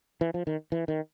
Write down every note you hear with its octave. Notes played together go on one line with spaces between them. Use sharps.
E3
F3
D#3
E3
D#3